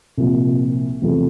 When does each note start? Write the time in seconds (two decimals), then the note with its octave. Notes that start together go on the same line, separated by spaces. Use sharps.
0.17 C2 A#2 F3
1.02 E2 C3 F3 A3